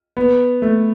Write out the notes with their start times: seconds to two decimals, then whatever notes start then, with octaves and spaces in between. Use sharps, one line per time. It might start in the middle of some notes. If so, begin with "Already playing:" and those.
0.17 B3
0.62 A3